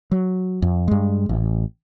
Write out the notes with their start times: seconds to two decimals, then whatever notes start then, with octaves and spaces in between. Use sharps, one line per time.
0.11 F#3
0.62 F2
0.88 G2 G#3
1.29 A1